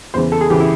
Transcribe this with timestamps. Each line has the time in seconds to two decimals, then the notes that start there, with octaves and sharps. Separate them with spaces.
0.14 E2 C#3 E3 C5
0.32 A4
0.41 G#4
0.50 C#3 E3 G4
0.60 E4